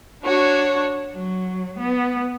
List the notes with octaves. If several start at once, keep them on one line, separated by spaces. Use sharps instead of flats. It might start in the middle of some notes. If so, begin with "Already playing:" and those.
D4 F#4 C#5
F#3
B3